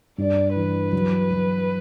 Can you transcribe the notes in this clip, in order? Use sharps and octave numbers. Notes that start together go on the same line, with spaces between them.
G2 D5
E3 B4
F#3
F#3